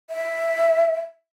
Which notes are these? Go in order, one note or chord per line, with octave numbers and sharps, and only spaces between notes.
E5